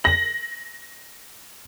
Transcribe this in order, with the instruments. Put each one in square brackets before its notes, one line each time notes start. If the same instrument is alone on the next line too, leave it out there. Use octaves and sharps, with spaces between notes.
[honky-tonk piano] A#6 F#7